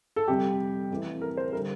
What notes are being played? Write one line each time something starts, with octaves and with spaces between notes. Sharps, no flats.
A4
F2 C3 G3 G4
F2 E3 A3
A#4
C5
D3 G3 A#4